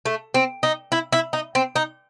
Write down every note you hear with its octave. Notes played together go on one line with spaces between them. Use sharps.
A3
C4
D#4
E4
E4
D#4
C4
D#4